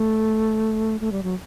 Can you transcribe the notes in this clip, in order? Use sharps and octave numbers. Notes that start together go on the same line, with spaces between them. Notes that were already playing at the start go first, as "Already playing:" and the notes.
Already playing: A3
A3
G3
F#3